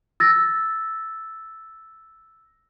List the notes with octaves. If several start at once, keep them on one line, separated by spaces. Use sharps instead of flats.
E6 A6 A#6